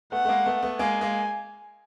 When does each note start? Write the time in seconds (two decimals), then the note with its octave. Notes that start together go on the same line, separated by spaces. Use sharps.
0.12 A3 B3 F#5
0.25 A3
0.29 G#3 A#3
0.46 A3 B3
0.62 A3 B3
0.79 G#3 A#3 G#5
1.01 G#3 A#3